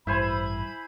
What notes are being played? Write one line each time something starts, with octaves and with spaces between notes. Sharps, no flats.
A1 G2 E4 C5 G#5 B5